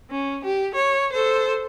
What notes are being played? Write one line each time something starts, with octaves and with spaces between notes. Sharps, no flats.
C#4
G4
C#5
A4 C5